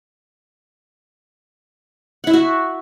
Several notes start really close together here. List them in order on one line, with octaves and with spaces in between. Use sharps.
F#5 E4 E5 F#4